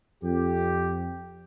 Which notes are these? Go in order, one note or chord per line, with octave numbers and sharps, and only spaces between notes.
F2 G4